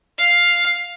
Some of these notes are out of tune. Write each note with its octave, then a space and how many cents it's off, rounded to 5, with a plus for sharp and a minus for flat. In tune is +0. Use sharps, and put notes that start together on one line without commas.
F5 +0